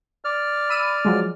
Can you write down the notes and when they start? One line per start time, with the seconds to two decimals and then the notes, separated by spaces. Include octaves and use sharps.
0.25 D5 F6
0.70 B5 E6 D#7
1.05 F3 F#3 G#3